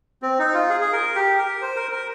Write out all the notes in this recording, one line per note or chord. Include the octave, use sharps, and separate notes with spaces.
C4
D#4
F4
G#4
G#4
A#4
G4
A#4
C5
A#4
A#4